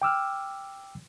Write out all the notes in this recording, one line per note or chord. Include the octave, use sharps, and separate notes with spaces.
G5 D6 E6 F6